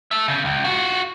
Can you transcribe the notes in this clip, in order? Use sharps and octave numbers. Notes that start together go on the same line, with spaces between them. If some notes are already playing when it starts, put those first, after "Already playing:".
A4 E5
C#3
C#2
F4 F#4